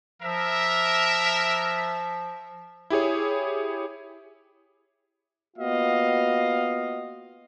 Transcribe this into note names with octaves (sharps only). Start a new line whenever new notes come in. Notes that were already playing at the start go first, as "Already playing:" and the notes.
F3 A#4 E5
E4 G4 G#4 C#5
A#3 B3 F4 F#4 D#5 F5